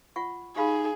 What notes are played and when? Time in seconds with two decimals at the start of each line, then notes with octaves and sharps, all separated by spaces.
0.16 F4 F#5 C#6
0.56 D#4 G4 G#4 F5 B5